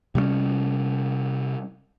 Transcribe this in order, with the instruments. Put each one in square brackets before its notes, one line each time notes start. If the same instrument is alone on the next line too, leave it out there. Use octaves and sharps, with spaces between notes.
[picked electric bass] C3 G3 A3 C#4